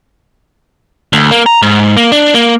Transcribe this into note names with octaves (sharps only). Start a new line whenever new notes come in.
D2
A#3
A#5
G#2
A#3
D4
A#3